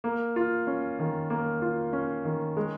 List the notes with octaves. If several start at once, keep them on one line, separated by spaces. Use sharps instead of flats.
A#3
F4
C#4
D#3
A#3
F4
C#4
D#3
G#3